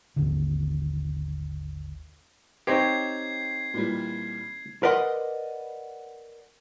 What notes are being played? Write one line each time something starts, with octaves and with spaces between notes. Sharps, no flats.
G#1 D#2 D3
C4 D#4 G4 C5 C#5 G#6 C7
A#2 E3 G3
A#4 B4 D5 D#5 F#5 C6